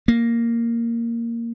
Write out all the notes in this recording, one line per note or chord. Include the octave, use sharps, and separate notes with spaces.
A#3